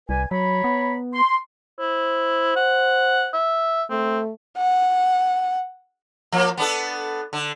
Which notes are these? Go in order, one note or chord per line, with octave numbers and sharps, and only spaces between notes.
C2 B4 D5 G#5
F#3 C#5 A#5 B5
B3
C6
E4 C5
F#5
E5
A3 C4
F#5
F3 A#3
B3 D4 A4
D3